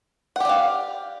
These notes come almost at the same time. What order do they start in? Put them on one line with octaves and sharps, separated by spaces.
F#5 G4 D5 F5